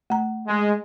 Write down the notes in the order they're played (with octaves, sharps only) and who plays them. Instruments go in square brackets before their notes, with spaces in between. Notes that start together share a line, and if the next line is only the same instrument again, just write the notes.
[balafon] A3 A#5
[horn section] G#3